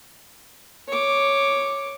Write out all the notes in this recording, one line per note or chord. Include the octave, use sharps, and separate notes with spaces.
C#5 D6